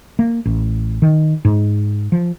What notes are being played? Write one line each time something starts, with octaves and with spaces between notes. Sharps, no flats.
A#3
A1
D#3
G#2
F3